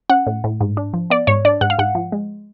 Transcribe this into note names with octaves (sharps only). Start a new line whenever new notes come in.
C#4 F#5
A2
A2
G#2
D4
F3
B3 D5
G#2 C#5
D4 D5
G#2 F#5
F5
G#2 F#5
F3
G#3